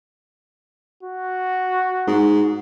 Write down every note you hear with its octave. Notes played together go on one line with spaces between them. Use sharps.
F#4
G#2